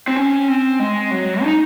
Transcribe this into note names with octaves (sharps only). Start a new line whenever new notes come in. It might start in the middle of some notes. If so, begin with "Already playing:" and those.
C4
C#4
C4
G#3
F#3
D#4